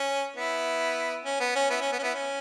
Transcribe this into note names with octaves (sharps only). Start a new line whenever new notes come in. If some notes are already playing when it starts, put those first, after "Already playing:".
Already playing: C#4
B3 E4
C#4
B3
C#4
B3 E4
C#4
B3
C#4
B3 E4
C#4